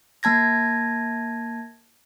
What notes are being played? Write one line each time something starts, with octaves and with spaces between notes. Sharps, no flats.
A#3 A5 G#6 A#6